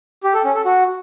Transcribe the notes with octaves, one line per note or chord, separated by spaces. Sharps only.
G4
A4
C#4
A4
F#4